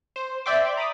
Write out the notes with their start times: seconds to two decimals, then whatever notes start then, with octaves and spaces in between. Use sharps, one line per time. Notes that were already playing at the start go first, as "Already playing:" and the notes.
0.16 C5
0.46 D5 E5 G5 C6 D6
0.77 A#5 B5 D6 D#6